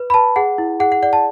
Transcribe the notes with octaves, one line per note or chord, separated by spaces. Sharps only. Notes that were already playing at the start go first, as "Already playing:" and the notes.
Already playing: B4
B5
B4 A5
G#4 F#5
E4
G#4 F#5
F#5
D5 F#5
A5